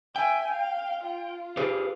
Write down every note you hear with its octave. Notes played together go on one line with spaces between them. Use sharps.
E5 G5 G#5
F5
F4
G4 G#4 B4